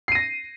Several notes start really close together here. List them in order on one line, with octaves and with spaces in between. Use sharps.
C7 D#7 A#6